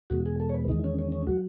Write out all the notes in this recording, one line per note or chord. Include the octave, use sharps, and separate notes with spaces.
E2 B2 G#3 F#4
G#4
A4
C#5
B4
E2 D#3 G#3 D#4
C#4
C#4
C#4
F#3 F#4